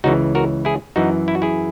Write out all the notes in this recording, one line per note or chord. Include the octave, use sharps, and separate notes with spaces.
C#2 C#3 E3 D#4 F#4
F#4 A#4
E4 G#4
F#2 E3 D#4 F#4
E4
F#4
E4 G#4